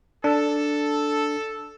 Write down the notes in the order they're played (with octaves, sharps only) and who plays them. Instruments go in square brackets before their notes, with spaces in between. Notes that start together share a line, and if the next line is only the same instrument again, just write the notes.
[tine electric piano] D4 [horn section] A4